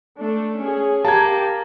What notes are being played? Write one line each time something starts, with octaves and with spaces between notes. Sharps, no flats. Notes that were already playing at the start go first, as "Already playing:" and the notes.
A3 D4
C#4 G#4
A#3 G4 A5 G#6